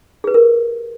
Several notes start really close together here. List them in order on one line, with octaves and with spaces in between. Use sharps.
G#4 B4 G4 A#4